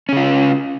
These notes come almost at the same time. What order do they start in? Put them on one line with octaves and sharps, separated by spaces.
C#4 C#3 F4